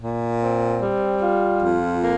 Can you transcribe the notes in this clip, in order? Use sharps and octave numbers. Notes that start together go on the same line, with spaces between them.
A#2
C4
G3
F4
F2
A#3